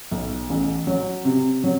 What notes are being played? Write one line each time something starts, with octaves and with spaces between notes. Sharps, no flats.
B1
A1
F#3
C3
F#3